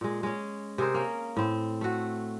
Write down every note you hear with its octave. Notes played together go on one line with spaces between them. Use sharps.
A#2 G#3
G#3 C#4
C3 G#4 A#4 C5
A#3 C#4
A2 C4
A3 F#4